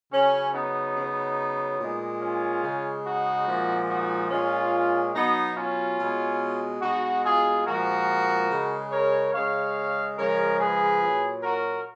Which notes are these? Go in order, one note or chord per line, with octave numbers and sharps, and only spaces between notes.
C#3 F#3 C#4
B3 D#4
C#3 F#3
A#2 G#3
C#4 F4
C#3 G#3
D#4 F#4
A#2 F3 G#3
D#4 F#4
A#2 G#3 C#4 F4
B2 F#3 B3 D#4
C#4 F4
B2 G#3
B2 G#3 D#4 F#4
F4 G#4
A#2 F3 G#3 F#4 A#4
C#3 G#3
A#4 C#5
C#3 G#3 C#5 F5
C#3 F3 G#3 A#4 C#5
G#4 B4
A#2 F#3
F#4 A#4